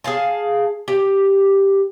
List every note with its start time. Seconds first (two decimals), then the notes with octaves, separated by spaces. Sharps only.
0.04 G#4 C5 F5 A5
0.88 G4